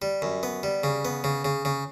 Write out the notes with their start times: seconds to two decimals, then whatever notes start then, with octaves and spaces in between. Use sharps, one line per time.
0.02 G3
0.22 F#2
0.43 B3
0.63 G3
0.84 C#3
1.05 B3
1.24 C#3
1.45 C#3
1.65 C#3